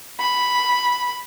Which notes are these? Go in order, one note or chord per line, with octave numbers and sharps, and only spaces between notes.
B5